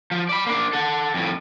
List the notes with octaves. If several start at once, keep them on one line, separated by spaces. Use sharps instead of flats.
F3
D5 B5
A#3 D4
A4 F#5
F2 A2